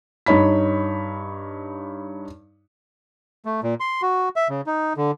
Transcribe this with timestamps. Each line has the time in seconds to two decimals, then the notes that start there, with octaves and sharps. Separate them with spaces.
0.26 G2 D#4 C#5 B5 B6
3.45 A3
3.63 A#2
3.80 C6
4.02 F#4
4.36 E5
4.49 C#3
4.66 D#4
4.97 D3